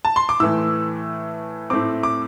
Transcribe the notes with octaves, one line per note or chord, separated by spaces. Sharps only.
A5
C6
D6
A2 E3 A3 E6
A2 A3 C4 D6
D6